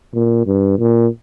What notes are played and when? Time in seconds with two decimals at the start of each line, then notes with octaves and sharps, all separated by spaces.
0.14 A#2
0.46 G2
0.79 A#2